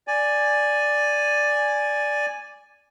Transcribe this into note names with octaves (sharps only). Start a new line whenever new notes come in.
D5 G#5